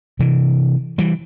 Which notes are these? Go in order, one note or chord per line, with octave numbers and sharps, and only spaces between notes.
C3 E3
E3 G3